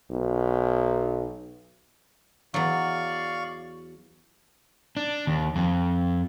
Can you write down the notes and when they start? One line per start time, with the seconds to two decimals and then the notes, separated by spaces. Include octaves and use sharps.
0.10 B1
2.54 E2 F#3 D5 F5 C#6
4.97 D4
5.27 D#2
5.56 F2